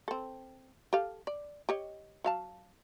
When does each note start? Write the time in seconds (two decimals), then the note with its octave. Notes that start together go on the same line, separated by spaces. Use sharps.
0.08 C4 A4
0.93 G4 A4 F5
1.27 D5
1.69 G4 C#5 D#5
2.24 F#3 F5 A5